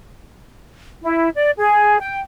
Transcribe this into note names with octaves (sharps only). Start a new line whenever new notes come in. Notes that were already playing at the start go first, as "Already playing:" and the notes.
E4
D5
G#4
G5